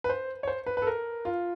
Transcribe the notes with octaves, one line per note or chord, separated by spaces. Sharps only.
B4
C5
C#5
C5
B4
A4 B4
A#4
F4